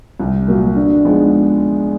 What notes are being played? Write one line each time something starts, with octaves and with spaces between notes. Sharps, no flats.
C2
A#2 F#3 A#3
D3
F3 G#3 B3 D#4